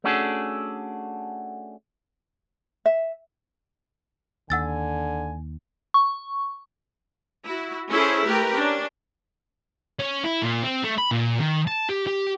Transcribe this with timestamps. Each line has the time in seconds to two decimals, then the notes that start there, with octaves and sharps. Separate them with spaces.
0.04 A3 C#4 D4 F#4 G#4 A4
2.86 E5
4.50 D#2 D3 F#5 G#5 E6 A6
5.94 C#6
7.47 E4 F#4
7.91 C#4 E4 G#4 A4 C5
8.24 A3 G4 A#4 B4
8.54 C#4 D4
9.99 C#4
10.24 E4
10.43 A#2
10.63 C4
10.84 A3
10.98 B5
11.11 A#2
11.39 D#3
11.68 A5
11.89 G4
12.07 G4